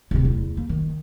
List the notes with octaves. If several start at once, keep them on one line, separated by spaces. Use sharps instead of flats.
D1 C3
E2
A#3
D#3